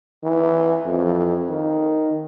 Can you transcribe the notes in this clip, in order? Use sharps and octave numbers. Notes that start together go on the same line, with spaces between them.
E3
F2
D#3